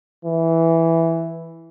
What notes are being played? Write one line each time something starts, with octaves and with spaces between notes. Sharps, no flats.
E3